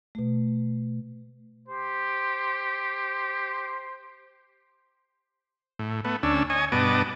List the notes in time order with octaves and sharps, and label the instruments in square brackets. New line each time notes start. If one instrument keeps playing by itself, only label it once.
[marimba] B2 A3
[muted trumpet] G4 [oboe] C5
[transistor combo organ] A2
A3 B3
D2 C#4 D4 E6
C#5 D#5 G#5
G2 B2 B3 D#5 A5 D6